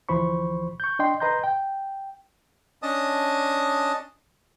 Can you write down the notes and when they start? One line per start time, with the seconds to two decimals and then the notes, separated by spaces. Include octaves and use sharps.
0.09 D2 E3 F3 C5 B5 C#6
0.80 C#6 G6
0.99 D4 D#5 G5 C6
1.20 B4 D#5 A#5 C6 G6
1.44 G5
2.83 C#4 D4 D#5 A5 D#6